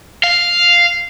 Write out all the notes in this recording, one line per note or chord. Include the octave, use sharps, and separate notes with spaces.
F5